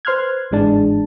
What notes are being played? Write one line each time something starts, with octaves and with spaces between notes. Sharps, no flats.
B4 C5 C6 F6 F#6 G#6
G1 G#2 E3 G#3 D4 A5